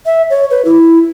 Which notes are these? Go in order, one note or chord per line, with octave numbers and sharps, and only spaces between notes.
E5
C#5
B4
E4